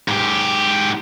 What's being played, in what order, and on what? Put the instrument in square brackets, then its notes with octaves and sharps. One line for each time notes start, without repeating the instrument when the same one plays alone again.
[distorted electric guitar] G#2 G4